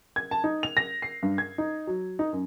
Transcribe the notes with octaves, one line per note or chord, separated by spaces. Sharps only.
G#6
A5
D#4
F7
A#6
C7
G2
G#6
D#4
F#3
D#4
F#2